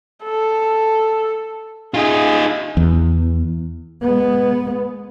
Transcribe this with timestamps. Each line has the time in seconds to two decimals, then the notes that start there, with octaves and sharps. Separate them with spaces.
0.24 A4
1.94 D#4 F4 G#4
2.77 E2
4.02 G#3 B3